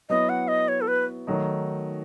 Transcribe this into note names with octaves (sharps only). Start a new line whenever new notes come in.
F#3 B3 E4 D#5
F#5
D#5
C#5
A4
B4
D#3 F#3 A3 D#4